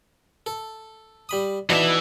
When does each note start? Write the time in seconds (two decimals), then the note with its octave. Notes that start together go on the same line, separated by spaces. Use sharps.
0.46 A4
1.29 G3 B5 D#6
1.70 B2 E3 D4 D#4 E5